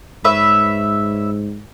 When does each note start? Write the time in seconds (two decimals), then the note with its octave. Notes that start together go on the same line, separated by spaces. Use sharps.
0.24 G#2 B4 C#5 E5